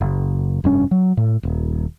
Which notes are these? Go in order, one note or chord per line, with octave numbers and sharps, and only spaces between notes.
F#1
F1 G2 C#4
F#3
A2
D#1